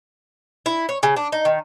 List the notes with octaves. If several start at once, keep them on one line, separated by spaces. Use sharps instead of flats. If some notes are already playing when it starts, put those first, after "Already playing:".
E4
C#5
C#3
D4
D#4
D#3